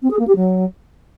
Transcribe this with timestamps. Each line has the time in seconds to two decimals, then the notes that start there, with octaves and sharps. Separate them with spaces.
0.02 C4
0.10 G#4
0.19 A#3
0.27 G4
0.36 F#3